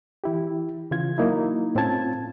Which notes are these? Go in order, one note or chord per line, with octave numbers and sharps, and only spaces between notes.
E3 E4 G4
C#3 E3 F4 G#6
F#3 A#3 D#4 E4
A2 C4 C#4 F4 A5 G#6